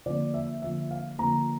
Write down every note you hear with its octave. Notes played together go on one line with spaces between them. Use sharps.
D3 F3 A#3 D5
E5
D3 F3 A#3 E5
F5
D3 F3 A#3 A#5